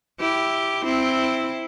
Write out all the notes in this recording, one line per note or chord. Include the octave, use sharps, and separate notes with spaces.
E4 G4
C4 E4